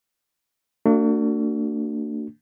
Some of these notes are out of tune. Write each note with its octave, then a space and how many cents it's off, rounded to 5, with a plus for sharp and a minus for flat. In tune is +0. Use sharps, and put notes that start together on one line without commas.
A3 +45 D4 +0 F#4 +0